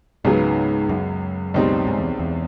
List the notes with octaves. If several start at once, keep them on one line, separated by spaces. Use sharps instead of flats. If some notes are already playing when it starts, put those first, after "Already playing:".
C#2 G#2 C#3 F#3 B3
F#2
C#2 B2 G3 C4 D#4
G#2
E2
E2